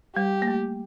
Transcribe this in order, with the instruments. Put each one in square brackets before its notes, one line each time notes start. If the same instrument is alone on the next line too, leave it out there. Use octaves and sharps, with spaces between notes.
[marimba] G3 [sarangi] G4
[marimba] A#3
A3